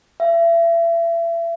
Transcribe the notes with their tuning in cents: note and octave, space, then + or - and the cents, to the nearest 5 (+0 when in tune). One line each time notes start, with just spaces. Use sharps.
E5 +35